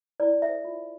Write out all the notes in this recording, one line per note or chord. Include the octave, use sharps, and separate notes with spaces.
E4 D5
A4 C5 E5
F4